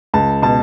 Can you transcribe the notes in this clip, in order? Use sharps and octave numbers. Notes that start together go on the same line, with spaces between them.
C#2 A5
B2 A5